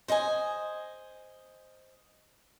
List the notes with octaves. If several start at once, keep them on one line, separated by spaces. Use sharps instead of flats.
C5 D#5 G5 G#5